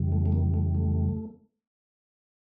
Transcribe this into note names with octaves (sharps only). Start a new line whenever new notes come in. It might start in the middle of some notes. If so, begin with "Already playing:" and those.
Already playing: F2 C#3 E3 G3
A3
A3
A#3
A3
A3